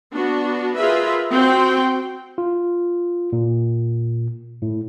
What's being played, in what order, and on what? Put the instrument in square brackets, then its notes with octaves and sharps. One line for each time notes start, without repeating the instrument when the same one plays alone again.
[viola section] B3 D4 F#4
F4 G#4 A#4 B4 E5
C4 F#4 G5 C6
[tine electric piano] F4
A#2
A2